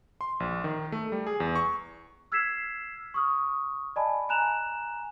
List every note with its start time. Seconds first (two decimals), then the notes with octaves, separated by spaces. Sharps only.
0.21 C6
0.40 A#1
0.64 D#3
0.92 A3
1.12 G3
1.27 G#4
1.40 E2
1.56 C#6
2.32 E6 F6 G#6 B6 C7 E7
3.14 C#6 D#6 F6
3.96 D5 D#5 G#5 A5 B5
4.29 G#5 A#5 F#6 E7 F7